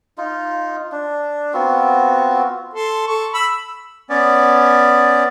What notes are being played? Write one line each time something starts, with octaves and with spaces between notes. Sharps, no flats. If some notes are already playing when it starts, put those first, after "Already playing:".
D#4 F4
D4
B3 C4 F4 F#4
A4 C6
A4 C#6
B5 E6
B3 C#4 D5